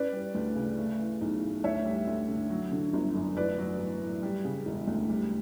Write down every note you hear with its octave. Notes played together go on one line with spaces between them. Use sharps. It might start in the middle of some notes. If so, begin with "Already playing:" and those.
Already playing: C#4 B4 D5
G3
D2
C#3
A3
E3
B1
A2
D2 C#5 E5
G3
D2
D3
F#3
D3
G1
F#2
A1 B4 D5
F#3
A1
A2
G3
C#3
E1
D2
G3